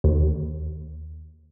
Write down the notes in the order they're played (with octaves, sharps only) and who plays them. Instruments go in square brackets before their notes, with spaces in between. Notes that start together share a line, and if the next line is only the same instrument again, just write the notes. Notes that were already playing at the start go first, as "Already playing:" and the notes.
[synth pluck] D#2